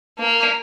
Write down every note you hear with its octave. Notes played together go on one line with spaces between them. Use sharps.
A#3